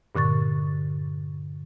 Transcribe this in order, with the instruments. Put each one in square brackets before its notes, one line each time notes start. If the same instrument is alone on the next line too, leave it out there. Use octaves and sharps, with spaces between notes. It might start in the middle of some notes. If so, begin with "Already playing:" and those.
[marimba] G2 A#2 D3 C#6 A6